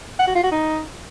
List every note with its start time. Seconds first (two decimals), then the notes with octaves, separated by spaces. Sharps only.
0.19 F#5
0.27 F#4
0.35 F4
0.43 F#4
0.51 D#4